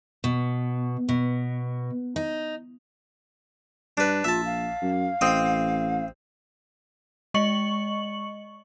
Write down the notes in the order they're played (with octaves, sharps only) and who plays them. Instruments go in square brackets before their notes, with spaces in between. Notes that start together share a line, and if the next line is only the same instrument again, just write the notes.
[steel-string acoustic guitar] B2
B2
D#4
[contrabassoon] G2 [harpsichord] D4 B4
[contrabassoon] A#1 [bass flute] F4 [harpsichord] E5 A5
[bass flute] F5
[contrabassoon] F#2
[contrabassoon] A1 [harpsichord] C4 D#5 D#6
[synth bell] G#3 D#5 C#6 C#7 F#7